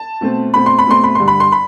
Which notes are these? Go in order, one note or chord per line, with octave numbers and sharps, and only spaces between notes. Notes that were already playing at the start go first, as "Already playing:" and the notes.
Already playing: A5
B2 A3 C4
B2 A3 C4 B5
C6
B5
B2 A3 C4 C6
B5
G2 D3 G3 C6
B5
C6
B5